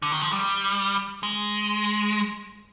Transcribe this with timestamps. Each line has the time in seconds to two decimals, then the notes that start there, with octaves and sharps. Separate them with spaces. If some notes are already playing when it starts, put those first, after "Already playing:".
0.02 D3
0.12 D#3
0.21 F3
0.31 G3
1.23 G#3